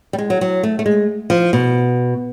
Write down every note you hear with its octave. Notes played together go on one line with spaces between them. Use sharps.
G3
G#3
F#3
F#3
A3
A3
G#3
F3
B2